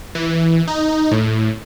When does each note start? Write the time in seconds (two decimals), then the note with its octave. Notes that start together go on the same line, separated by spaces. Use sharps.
0.15 E3
0.67 D#4
1.11 A2